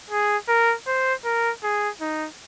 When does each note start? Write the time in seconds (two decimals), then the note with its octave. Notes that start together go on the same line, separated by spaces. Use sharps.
0.11 G#4
0.49 A#4
0.87 C5
1.25 A#4
1.64 G#4
2.01 D#4